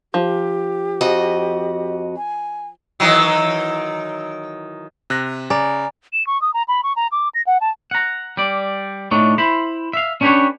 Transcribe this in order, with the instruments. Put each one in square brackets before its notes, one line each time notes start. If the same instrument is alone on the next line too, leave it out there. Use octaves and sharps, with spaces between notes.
[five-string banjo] F3 [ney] G4
[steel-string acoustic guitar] F2 F#4 D#5
[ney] G#5
[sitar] D#3 E3 F#3
[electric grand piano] C3 F#6 A#6
[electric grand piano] C#3 [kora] D5 [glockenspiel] G#5 A#5
[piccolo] E7
C#6
D#6
A#5
B5
C#6
A#5
D6
A#6
F#5
A5
[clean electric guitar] F#5 A#5
G3 D5
A2 A3 D4 D#4 C#5
E4 C5 B5
E5 F5
C#4 D4 G4 A#4 B4 C#5